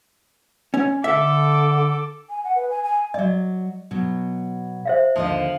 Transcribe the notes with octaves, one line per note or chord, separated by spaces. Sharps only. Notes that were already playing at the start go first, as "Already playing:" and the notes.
C#4
D3 A4 E5 D6
G#5
F#5
B4
G#5
G#5
F#3 D5 D#5
B2 F#3
C5 E5 F5
D#2 D3 F3 D#5